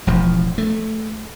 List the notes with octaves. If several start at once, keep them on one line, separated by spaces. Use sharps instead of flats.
E1 A1 F3
A3